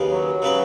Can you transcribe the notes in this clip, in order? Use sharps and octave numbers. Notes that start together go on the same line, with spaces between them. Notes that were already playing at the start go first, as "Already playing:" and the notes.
Already playing: D#2 C#3 B3 G#4
F#3
C#3 B3 F#4 B4